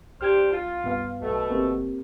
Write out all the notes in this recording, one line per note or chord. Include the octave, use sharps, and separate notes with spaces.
C2 D4 G4 C5 F6 G#6
F4
G2 B3 F5
B1 B2 A3
G1 A#3 C4 G4